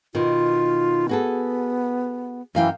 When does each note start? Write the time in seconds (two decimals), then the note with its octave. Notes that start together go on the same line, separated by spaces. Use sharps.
0.15 B2 D#3 F4
1.09 B3 F#4 G#4 A4
2.55 F#2 E3 F5 G5